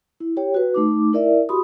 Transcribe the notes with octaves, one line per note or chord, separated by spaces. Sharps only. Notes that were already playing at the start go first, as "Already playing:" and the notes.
E4
G4 C#5 G5
F#4 B4
A3 D#4 D6
E4 A#4 D5 E5
F#4 G4 B5 C6 D#6